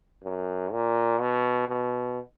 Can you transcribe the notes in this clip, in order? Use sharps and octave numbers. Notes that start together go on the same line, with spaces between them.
F#2
A#2
B2
B2